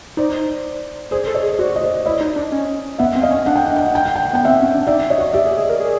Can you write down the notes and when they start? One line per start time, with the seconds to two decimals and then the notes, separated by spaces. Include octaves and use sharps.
0.17 D#4 C5 D5
1.11 G#4 C5 D5
1.27 A4
1.34 C#5 D#5
1.43 G#4
1.59 F#4 C5 D5
1.76 D#5
1.81 C5 D5
2.06 E4 C#5 D#5
2.21 D#4
2.36 D4
2.52 C#4
2.99 B3 E5 F#5
3.15 C4
3.22 D#5 F5
3.31 C#4
3.46 D4 F#5
3.56 G5
3.66 F#5
3.76 G5
3.86 F#5
3.95 G5
4.06 F#5
4.16 G5
4.25 F#5
4.33 B3 G5
4.44 C4 E5 F#5
4.60 C#4
4.74 D4
4.87 D#4 D5 E5
5.10 C#5 D#5
5.18 F#4
5.33 G4 D5 E5
5.46 G#4
5.57 G#4
5.69 A#4
5.80 G#4